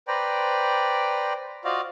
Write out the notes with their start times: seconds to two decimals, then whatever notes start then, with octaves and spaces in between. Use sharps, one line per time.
0.08 B4 C5 D5 G5 A#5
1.64 F4 F#4 C5 D5 D#5 F5